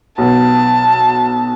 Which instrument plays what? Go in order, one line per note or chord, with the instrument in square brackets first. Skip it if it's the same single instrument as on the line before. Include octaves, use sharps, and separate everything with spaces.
[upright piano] B1 B2 B3 [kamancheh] A5